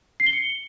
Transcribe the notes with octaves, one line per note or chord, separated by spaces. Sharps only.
C7
G7
C#7